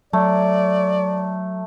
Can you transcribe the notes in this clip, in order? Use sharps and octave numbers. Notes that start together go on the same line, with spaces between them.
F#3 A3 D5